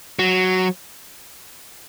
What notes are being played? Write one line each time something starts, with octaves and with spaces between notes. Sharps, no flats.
F#3